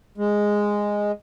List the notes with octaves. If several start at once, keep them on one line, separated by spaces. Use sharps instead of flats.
G#3